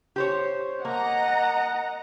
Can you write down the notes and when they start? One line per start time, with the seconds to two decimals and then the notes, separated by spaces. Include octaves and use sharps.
0.16 G4 C5 C#5
0.85 A#3 D#5 F#5 A#5